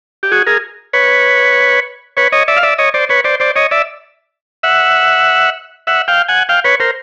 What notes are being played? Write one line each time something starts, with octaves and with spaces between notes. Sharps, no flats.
G4
F#4 G#4
G#4 A#4
B4 C#5
B4 C#5
C#5 D#5
D5 E5
F5
D5 E5
C#5 D#5
C5 D5
B4 C#5
C5 D5
C5 D5
C#5 D#5
D5 E5
E5 F#5
E5 F#5
F5 G5
F#5 G#5
F5 G5
B4 C#5
A#4 C5